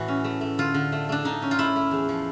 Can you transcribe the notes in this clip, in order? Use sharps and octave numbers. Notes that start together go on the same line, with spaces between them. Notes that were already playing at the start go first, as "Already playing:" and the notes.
Already playing: A2 E3 F#4
C#4
A3
A3
D3 F4
D3
A3
A3 D4
D3 D#4
C#4
F4
A3 E4
A3
E2
F3